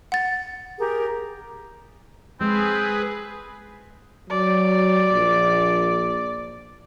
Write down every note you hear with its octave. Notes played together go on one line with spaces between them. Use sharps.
F#5 A6
G4 G#4 A#4
G#3 C4 G#4 B4
F#3 D5
A#1